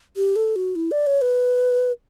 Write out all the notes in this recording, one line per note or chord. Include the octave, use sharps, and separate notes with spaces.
G4
A4
F#4
E4
D5
C#5
B4